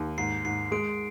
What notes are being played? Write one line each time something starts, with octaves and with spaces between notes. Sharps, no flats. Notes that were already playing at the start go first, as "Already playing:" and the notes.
Already playing: D#2
G#2 C7
G#2 C7
G#3 D7